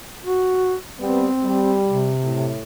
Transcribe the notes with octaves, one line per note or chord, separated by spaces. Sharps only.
F#4
G3 B3 C4
G3
C3
A2